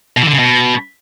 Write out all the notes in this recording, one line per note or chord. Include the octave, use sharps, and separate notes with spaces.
B2
E3
D3
C#3
B2